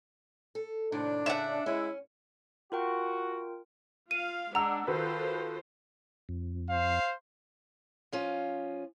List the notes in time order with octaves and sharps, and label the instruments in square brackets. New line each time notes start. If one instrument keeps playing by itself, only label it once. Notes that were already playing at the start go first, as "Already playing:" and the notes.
[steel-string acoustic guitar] A4
[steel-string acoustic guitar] D#2 A2 C3 [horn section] D4
[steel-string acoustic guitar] A2 C#3 [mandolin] E5 F#5
[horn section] G#3 E4 [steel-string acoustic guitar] C#4
[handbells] F4 A#4 G5 [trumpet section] F#4
[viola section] F4 F5 [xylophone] D#7
[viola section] G#3 D4 [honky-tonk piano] F#5 E6 [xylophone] A#5
[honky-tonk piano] D#3 F#4 B4 [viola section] F4 A4 C5
[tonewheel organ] F2
[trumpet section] C5 F5
[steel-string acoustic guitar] F3 C#4 F4